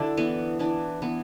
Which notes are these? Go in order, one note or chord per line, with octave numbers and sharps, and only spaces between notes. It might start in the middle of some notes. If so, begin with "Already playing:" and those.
Already playing: D3 D4 E4 F#4
E3 B3
E3 D4
E3 B3